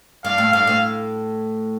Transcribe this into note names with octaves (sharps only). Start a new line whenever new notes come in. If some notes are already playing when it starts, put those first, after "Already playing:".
G2 F5
A2
G2 F5
A2